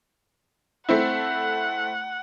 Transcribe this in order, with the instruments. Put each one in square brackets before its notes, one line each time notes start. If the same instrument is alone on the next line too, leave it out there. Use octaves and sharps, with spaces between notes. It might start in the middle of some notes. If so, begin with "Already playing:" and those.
[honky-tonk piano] A3 C4 E4 [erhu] F#5